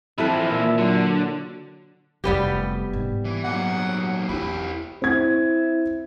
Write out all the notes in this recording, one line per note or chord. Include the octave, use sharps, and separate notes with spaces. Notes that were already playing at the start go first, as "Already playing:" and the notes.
E3 F3 C4 E4 A4 B4
A#2 E5
D3 F#3
F1 G3 B3 F4 G4
G#2
E3
A#2 F#3 F#5
E2 E4 G4 B5
C4 E4 G#6